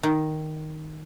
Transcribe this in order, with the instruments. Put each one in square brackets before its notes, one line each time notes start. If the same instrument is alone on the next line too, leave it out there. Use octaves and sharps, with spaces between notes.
[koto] D#3